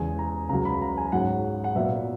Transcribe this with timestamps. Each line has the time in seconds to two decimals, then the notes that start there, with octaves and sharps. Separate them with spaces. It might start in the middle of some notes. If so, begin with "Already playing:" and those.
Already playing: E2 C#3 G#3 G#5
0.19 A#5
0.49 C#2 C#3 F#3 A#5
0.65 B5
0.82 A#5
0.98 G#5
1.12 G#2 F#3 C#4 F#5
1.64 F#5
1.75 A#2 F#3 B3 E5